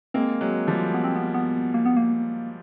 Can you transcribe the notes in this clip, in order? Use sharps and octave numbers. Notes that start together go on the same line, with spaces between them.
G#3 A#3 C4
F#3 G#3
F3 G3
B3
C4
B3
B3
A#3
B3
A#3